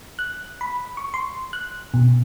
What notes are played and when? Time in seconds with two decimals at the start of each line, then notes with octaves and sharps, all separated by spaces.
0.19 F#6
0.61 B5
0.97 C#6
1.14 C6
1.53 F#6
1.94 B2